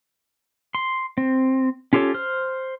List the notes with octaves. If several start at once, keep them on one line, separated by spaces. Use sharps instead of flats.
C6
C4
C#4 F4 G4 A4 C#5
C5 F6